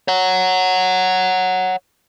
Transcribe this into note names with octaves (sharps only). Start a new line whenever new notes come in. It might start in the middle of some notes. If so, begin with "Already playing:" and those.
C#5 F#5